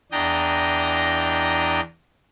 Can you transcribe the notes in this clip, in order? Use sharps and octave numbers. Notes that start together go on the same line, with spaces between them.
E2 D4 D#5 G5 A#5